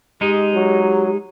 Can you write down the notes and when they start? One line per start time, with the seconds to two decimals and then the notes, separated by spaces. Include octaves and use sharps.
0.21 G#3 D#4 G4
0.54 F#3